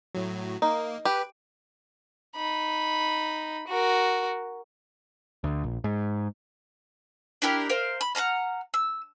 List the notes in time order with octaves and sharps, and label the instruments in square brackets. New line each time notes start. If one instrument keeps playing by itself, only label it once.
[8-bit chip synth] A2 F#3
[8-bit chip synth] A#3 [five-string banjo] D#4
[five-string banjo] G4 [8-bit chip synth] B4
[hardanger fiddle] D#4 B5
F#4 A#4
[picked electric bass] D2
A#1
G#2
[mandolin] D4 E4 G4 A#4
A#4 C5 F5
B5
F#5 A5 A#5 F6
E6